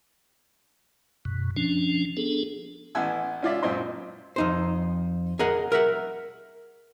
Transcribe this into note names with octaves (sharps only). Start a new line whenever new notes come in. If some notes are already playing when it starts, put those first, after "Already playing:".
F#2 B2
F3 C#4 D4
B3 D4 G#4 A4
A1 B3 E4 F#5 G#5 E6
C#4 F4 D5 E5
F#2 A#2 C4 D#5 C6
F2 D#4 C5
G#4 A#4 D#5 F#5
A#4 E5 F#5